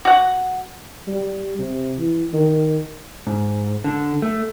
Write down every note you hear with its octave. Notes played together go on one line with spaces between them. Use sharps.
F#4 F#5
G3
C3
E3
D#3
G#2
D3
A3